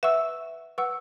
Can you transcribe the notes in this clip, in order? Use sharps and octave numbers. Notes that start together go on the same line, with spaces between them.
B4 E5 F#5 C#6 E6
B4 F#5 C#6 E6